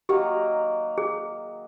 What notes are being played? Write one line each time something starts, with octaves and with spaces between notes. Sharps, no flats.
D#3 F#3 A#3 G4
G#4